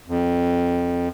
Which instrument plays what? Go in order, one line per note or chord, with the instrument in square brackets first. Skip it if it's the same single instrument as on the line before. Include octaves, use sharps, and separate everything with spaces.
[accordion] F2